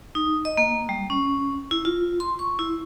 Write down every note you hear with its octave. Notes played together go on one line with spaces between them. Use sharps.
D#4
D#5
A#3
G3
C#4
E4
F4
C6
C#6
E4